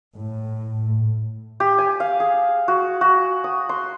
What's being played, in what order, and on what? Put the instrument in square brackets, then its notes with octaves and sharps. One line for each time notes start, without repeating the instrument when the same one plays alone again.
[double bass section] A2
[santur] G4
G#5
F5
G#4
F#4
F#4
D#6
C6